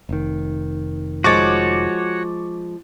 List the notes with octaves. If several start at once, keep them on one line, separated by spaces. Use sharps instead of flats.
F1 D#3
F3 G#3 F#4 C#5 C#6 D6 A6